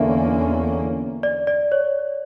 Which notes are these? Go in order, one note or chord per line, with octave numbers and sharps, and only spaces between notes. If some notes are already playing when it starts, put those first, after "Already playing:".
Already playing: E2 D3 A#3 C#4 E5
D5
D5
C#5